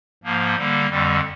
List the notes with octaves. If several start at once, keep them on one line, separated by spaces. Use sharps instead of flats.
G#2 F3 A#3
D3 G3 A#3
F2 D3 G3